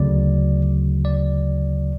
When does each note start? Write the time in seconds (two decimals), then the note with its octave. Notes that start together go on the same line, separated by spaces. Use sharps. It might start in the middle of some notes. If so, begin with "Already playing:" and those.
Already playing: D2 C#3 F#3 D5
1.05 D5